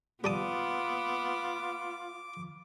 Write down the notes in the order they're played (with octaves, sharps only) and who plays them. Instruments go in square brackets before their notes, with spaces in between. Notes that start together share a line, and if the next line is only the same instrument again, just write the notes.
[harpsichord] G3 A5 D#6 [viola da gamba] B3 [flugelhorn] F4 [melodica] D6